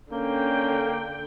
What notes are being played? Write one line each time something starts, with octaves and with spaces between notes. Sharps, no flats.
D3 A#3 C#4 G5